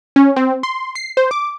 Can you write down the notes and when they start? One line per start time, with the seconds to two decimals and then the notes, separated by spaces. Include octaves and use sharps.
0.16 C#4
0.36 C4
0.63 C6
0.95 C7
1.17 C5
1.31 D6